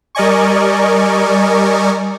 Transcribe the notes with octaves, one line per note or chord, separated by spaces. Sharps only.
G3 A#4 D5 D#5 G#5 C#6